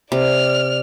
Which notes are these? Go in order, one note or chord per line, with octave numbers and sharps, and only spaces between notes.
C3 D5 F6